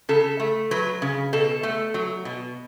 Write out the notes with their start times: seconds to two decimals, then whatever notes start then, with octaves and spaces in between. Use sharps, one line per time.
0.09 C#3 A4
0.40 A3
0.71 F#3 B4
1.02 C#3
1.33 B2 A4
1.63 A3
1.94 F#3
2.25 B2